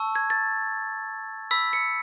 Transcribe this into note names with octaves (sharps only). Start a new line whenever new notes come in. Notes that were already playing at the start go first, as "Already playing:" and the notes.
Already playing: A5 C#6 E6
G#6
A6
B5 E6 B6
C#7